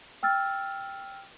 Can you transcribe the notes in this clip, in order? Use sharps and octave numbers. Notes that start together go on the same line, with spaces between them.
G5 E6 F6 A6